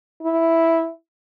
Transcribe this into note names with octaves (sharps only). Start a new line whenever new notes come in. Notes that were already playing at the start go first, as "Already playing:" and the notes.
E4